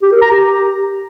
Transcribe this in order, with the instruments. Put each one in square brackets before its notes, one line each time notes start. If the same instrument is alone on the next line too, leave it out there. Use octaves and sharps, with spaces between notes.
[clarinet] G4
A#4
A#5
G4